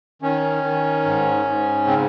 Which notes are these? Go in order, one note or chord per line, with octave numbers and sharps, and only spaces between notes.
D#3 C#4
D#3
G#2
G#2
C#3 C4